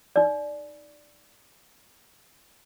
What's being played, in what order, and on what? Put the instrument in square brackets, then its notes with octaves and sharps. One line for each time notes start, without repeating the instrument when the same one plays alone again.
[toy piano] D#4 D5